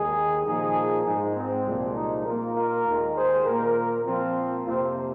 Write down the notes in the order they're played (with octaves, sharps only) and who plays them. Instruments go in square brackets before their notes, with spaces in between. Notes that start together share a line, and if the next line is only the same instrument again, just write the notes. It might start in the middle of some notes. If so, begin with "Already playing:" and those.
Already playing: [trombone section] D#2 D#3 G#3 D#4 G#4
A#2 F3 A#3 D#4 G#4
G#2 G#3 D#4
C4
C2 A#2 F3 G#3
D#4
A#2 A#3 F4 A#4
F4 A#4
D#2 D#3 G#3
G#4 C5
A#2 A#3 F4 A#4
A#2 F3 A#3 C4 F4
F2 C3 F3 A#3 C4 F4